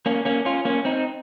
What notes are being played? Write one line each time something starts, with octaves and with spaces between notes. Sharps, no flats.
A#3 C#4
A#3 C#4
C#4 F4
A#3 C#4
C4 D#4